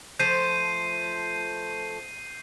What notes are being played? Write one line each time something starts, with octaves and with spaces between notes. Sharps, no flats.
F3 A3 C5 G6 C7 D#7